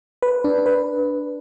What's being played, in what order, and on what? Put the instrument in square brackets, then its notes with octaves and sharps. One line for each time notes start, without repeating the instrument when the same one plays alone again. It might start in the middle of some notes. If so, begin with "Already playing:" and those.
[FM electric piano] B4
D4
B4